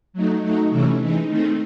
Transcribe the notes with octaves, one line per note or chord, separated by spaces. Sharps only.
F#3 A3 D#4
F#3 A3 D#4
C3 E3 A3 C#4 E4
E3 G#3 D#4
D#3 A3 C4 D#4